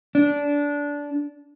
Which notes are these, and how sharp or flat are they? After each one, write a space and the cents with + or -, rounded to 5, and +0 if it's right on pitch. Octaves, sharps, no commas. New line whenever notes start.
D4 -20